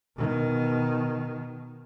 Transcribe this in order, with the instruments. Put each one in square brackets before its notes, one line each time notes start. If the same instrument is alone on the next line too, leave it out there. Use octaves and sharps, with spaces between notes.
[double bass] B2 D#3